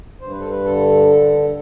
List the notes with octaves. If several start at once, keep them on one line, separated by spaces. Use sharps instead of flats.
G2 C5
B4
A4
B4
D3 A4